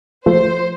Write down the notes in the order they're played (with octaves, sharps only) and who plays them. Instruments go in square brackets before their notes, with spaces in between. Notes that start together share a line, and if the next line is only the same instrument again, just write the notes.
[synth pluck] F3 A3 [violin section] C5